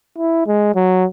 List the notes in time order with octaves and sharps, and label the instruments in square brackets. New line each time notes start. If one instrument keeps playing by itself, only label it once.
[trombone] E4
G#3
F#3